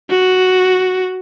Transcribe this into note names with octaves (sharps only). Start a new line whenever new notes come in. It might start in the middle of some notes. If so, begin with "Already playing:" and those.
F#4